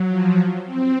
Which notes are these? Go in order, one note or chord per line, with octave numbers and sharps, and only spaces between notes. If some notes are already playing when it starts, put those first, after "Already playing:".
Already playing: F#3
F3
C4